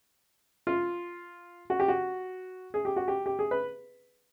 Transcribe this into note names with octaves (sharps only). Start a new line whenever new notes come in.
F4
F#4
G4
F#4
G#4
G4
F#4
G4
G4
G#4
B4